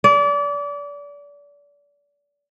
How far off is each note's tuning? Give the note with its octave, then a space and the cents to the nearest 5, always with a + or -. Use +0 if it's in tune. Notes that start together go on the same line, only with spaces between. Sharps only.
D5 -30